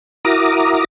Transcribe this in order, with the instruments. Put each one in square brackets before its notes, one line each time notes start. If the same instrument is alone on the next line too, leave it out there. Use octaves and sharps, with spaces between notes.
[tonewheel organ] E4 F#4 A#4 A#5 D6 D#6